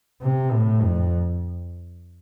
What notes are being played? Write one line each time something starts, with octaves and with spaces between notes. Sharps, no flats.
C3
A2
F2